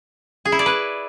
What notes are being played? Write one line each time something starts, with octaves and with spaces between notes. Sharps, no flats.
G#4
E4
D5
B4